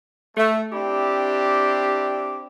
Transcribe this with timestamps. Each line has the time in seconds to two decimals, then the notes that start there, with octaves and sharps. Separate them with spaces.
0.38 A3
0.73 C4 D4 E4 G4